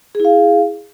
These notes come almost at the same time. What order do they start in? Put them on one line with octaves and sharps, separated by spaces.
G#4 E4 F5